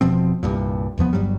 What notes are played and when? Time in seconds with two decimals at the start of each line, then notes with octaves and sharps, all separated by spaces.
0.01 E1 B2 F3 C4
0.43 C2 G2 A#2
0.98 F1 E2 F3 B3
1.13 G1 G2 F#3 G3